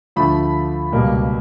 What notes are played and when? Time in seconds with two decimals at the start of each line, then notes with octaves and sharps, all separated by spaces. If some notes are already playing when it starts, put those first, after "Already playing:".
0.16 D2 D3 F3 A3 B5
0.92 C#2 B2 G3 A#3